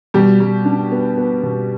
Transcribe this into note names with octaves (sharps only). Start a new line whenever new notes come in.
B2 G3 G4
G3
D4
B3
B3
B2